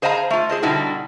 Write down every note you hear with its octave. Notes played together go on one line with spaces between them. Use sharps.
G#4 C5 D#5 F5 G5 A#5
A3 F4
G#4 C5 D#5
B2 D3 G3 D#4 E4 F#4